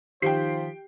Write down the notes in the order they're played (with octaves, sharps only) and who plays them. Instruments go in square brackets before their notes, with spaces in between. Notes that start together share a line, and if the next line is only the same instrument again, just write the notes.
[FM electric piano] D#3 D#4 B6 [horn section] F3 C5 [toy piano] G4 [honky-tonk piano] G5 C7